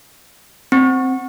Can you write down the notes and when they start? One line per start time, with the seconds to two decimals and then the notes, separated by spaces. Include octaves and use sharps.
0.72 C4